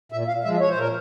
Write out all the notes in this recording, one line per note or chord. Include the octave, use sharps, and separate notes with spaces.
A#2 E5
F5
F3 G#3 E5
C#5
C5
A#2 A#4